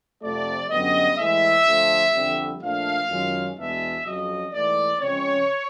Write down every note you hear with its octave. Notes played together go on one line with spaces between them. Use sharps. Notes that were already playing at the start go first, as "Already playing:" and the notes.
F2 C3 F3 A3 D5
F#2 D3 G3 B3 D#5
A2 E3 G#3 E5
D3 F3 A3
F2 D3 G3 C4
A#2 F3 A3 D4 F5
F#2 D#3 G#3 C#4 F4
E2 B2 G#3 B3 D4 E5
F2 C#3 F#3 D#5
G#2 E3 A3 D5
C#3 F3 G#3 C4 C#5